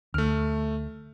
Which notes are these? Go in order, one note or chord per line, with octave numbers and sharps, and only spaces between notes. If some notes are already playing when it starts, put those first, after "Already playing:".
D2 A3 F6